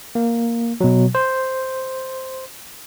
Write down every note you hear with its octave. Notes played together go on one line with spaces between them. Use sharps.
A#3
B2 F#3
C5